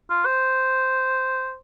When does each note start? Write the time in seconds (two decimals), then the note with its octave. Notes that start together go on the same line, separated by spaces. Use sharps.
0.10 F4
0.26 C5